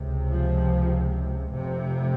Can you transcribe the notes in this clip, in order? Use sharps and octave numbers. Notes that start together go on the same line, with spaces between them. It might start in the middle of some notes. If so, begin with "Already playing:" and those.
Already playing: C#2 C3
F3
F1 F2 C3